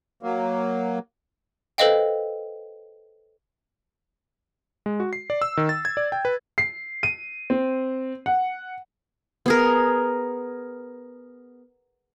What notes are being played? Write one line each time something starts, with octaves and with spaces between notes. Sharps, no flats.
F#3 A#3
A4 B4 C5 D#5 F5 G5
G#3
F#4
C7
D5
E6
D#3
A6
G#6
D5
G5
B4
C7
D#7
C4
F#5
B3 G#4 A#4